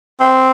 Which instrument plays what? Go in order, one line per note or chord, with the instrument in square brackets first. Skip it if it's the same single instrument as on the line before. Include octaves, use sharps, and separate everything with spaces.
[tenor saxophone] C4